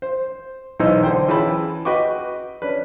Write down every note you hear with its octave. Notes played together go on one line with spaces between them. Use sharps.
C5
B1 E3 D#4 C5 D#5 E6
D3 C5 G5
E3 C#4 G#4 G5 A5 B5
F#4 B4 D#5 G5 C#6 D6
C#4 D4 B4